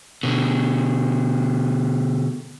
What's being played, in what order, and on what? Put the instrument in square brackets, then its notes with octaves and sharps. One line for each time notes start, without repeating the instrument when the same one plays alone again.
[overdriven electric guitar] B2 D3